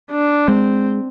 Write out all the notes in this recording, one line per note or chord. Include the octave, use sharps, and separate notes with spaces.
D4
G#3 C4